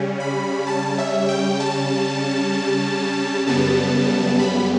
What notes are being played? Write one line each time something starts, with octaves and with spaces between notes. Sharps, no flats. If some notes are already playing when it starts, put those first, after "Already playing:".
Already playing: C#3 G3 C#4
B5
A5
E5
G5
A5
F#2 C#3 G3 B3 A5
B5